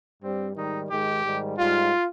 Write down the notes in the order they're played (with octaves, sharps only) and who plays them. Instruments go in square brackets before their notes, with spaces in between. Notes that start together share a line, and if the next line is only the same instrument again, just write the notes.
[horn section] G2 G3 C4
G#2 D#3 G3 D#4
G#2 D#3 G#3 G4
G#2 D#3 G3
G#2 G3 F4